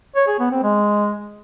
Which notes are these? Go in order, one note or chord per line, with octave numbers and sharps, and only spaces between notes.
C#5
G#4
B3
C4
G#3